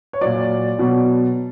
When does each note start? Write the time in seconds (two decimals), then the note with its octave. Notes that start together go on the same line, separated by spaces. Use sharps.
0.13 C#5
0.21 A#2 F#3 D5
0.78 B2 F#3